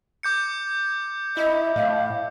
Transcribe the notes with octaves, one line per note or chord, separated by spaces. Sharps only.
D6 G6 C#7
E4 D#5
A2 F5